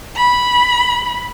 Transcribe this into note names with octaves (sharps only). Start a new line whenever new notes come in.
B5